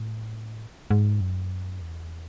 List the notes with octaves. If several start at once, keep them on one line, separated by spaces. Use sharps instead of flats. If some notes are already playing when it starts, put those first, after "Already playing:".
Already playing: A2
G#2
F#2
E2